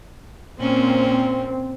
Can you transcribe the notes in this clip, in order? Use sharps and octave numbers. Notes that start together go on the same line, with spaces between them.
A#2 A#3 C4 C#4